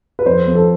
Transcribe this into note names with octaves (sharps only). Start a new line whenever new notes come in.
B4
F2 C5
F2
A4